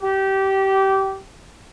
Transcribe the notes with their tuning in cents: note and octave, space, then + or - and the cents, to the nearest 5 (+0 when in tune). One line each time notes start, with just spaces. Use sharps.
G4 -20